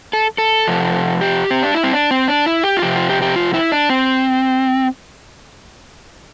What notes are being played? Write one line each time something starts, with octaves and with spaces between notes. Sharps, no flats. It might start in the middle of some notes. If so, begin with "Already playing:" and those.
A4
A4
C3 F3
G4
C4
D4
E4
C4
D4
C4
D4
E4
G4
F4
C3 F3 G4
F4
G4
G4
F4
E4
D4
C4